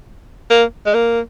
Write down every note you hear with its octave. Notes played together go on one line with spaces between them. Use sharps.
A#3
G#3
A#3